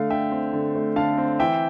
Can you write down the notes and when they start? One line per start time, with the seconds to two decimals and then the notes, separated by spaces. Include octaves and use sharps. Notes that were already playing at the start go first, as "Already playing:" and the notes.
Already playing: D3 A3 F5
0.10 D3 E5 G5
0.32 C4
0.53 D3
0.75 A3
0.96 D3 F5 A5
1.18 C4
1.39 E3 E5 G5